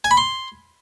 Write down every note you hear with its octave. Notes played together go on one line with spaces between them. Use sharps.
G#5
B5
C6